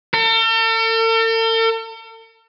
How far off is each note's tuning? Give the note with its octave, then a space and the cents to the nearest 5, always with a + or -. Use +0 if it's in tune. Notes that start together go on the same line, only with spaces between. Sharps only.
A4 +45